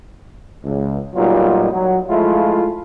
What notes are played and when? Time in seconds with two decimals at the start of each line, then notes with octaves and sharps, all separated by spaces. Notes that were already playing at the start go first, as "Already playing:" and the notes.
0.64 C#2
1.15 A#2 F#3 G3 B3 D#4 F4
1.72 F#3
2.09 F3 G#3 A3 E4 F4